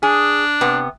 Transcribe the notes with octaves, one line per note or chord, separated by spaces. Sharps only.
D4 G#4
C3 B3